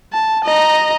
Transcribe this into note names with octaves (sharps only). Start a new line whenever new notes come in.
A5
D#5 A#5